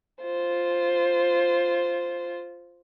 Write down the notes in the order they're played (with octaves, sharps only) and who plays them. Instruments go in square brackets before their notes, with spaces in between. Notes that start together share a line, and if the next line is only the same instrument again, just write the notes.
[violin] F4 C5